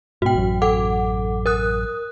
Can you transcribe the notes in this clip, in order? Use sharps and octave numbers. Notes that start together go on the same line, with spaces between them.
G#2 B2 F#4 G5
A1 F#2
A4 F#5 D6
A#4 D#6 F#6